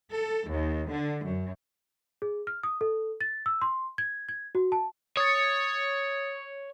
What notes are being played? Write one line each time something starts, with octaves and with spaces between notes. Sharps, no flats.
A4
D#2
D3
F#2
G#4
F6
D#6
A4
A6
E6
C6
G#6
G#6
F#4
A5
C#5 D#6 A6